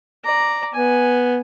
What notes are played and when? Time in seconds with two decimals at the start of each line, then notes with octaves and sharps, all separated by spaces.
0.25 D5 A#5
0.74 B3 G#5